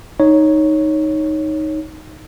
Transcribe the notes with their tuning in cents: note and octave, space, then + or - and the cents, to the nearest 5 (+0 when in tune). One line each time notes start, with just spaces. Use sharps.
D#4 +0 C#5 +0